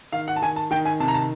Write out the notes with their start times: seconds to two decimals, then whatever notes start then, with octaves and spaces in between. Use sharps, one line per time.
0.12 D#3 F5
0.28 F#5
0.36 A5
0.42 D#3 G#5
0.56 A5
0.71 D#3 G5
0.85 G#5
1.00 C3 A5
1.08 A#5
1.14 A5